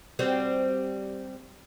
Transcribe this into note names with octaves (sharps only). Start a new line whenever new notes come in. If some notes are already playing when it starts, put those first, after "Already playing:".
G3 C4 F#4